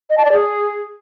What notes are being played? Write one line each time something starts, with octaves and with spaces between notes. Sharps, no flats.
D#5
A5
D5
G#4